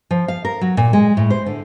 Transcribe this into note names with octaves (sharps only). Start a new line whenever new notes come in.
F3
F5
A#4
F#3
A#2
G#3
A2
C5
D3